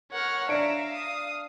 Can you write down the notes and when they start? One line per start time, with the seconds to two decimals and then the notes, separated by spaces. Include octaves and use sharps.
0.12 A#4 C#5 F#5 F6
0.49 D4 E5 F5 A#5 C#7 D7
0.94 D#6